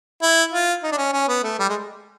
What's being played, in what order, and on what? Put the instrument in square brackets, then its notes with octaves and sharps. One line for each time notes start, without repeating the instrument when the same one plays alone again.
[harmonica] E4
F4
D#4
D4
C#4
C#4
B3
A3
G3
G#3